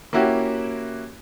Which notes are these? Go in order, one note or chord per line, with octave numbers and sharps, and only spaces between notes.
A#3 C#4 E4 F#4 G4